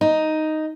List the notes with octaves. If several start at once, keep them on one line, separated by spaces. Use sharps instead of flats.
D#4